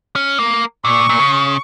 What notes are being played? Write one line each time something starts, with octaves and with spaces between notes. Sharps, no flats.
C#4
A#3
A#2 C#6
A#2
C#3